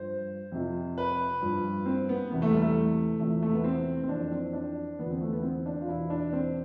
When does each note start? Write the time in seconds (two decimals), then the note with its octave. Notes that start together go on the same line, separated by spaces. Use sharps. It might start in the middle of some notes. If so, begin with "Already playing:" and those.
Already playing: G2 F3 C5
0.52 F2 C3 F3
0.98 B4
1.41 G2 F3
1.86 C4
2.09 B3
2.31 E2 C3 E3 B3
2.42 A3
2.52 G3
2.62 A3
3.20 E2 C3 F3 A3
3.42 A3
3.53 B3
3.64 C4
4.03 C4
4.09 F2 E3 D4
4.31 C4
4.53 D4
4.99 E2 D3 F3 B3
5.10 C4
5.21 A3
5.33 B3
5.43 C4
5.66 D4
5.81 F4
5.88 E2 B2 E4
6.10 D4
6.33 C4